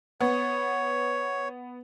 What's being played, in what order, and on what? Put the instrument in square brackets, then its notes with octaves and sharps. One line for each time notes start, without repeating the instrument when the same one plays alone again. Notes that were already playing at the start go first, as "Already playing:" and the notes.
[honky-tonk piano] B3 [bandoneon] C#5